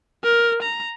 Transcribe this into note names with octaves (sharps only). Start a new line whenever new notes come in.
A#4
A#5